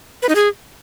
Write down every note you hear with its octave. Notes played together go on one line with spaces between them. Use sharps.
B4
D#4
G#4